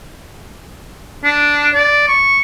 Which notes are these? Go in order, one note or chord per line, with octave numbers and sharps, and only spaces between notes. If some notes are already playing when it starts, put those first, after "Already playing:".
D4
D5
C#6